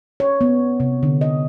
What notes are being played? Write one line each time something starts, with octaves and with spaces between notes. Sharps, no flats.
C#5
B3
C3
D3
D#5